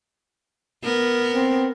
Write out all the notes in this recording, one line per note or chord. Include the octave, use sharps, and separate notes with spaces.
B3 A#4
C4